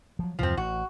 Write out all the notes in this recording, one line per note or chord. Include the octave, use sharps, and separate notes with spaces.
F3 F#3
E2 G2 C3 F3 C4
A1 F#4